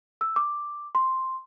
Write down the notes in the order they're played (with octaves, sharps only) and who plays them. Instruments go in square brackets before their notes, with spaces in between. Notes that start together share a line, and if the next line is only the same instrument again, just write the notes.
[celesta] E6
D6
C6